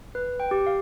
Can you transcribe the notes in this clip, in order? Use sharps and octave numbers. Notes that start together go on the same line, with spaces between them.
B4
G5
G4
F5